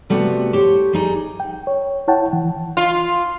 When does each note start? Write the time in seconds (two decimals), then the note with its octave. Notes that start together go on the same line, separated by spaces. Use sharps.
0.10 C3 G3 A3 B3 F#4
0.53 G4 C5 C#5
0.93 G3 D#4 G#4
1.40 G5
1.67 C#5
2.08 E4 C#5 F#5 G5 A5
2.33 E3
2.77 F4